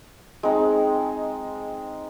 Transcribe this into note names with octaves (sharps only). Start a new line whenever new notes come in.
G#3 C4 D#4